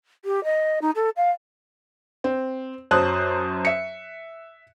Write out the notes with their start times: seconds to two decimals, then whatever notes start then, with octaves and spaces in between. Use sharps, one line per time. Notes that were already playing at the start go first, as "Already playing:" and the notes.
0.25 G4
0.44 D#5
0.81 D#4
0.95 A4
1.16 F5
2.24 C4
2.91 F#2 F#3 C5 A5 D#6 F#6
3.65 E5 C#7